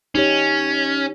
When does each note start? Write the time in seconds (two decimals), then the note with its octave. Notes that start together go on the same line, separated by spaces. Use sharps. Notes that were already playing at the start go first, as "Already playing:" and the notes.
0.15 C#4 D#4 G4 C#5